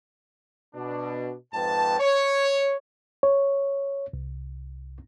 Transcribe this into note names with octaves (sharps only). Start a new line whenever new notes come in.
B2 D4
F2 G#2 B4 G5 A5
C#5
C#5
C2